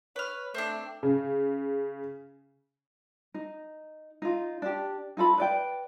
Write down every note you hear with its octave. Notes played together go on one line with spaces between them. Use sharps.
B4 C#5 F6
A3 C4 D4
C#3
D#4
D#4 F4
D4 G4
D#4 F4 A4 B5
B4 D5 G5